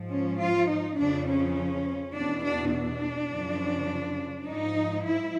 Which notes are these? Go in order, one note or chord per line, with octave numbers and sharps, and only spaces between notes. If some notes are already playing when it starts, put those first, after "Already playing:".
Already playing: G#2 F3
C#4
F4
D#4
F2 C#3 F3 D4
C#4
E2 B2 D4
D4
D4
F#2 C#3 F3
G#2 F3 D#4
E4